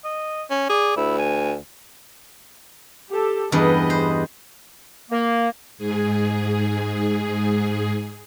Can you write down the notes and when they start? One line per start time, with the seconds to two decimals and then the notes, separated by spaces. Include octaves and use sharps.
0.04 D#5
0.51 C#4
0.70 G#4 D5
0.96 D2 E4
1.18 G#5
3.10 G4 A4
3.52 E2 G2 G#4 B4 D#5
3.90 C5
5.11 A#3
5.78 G#2 G#4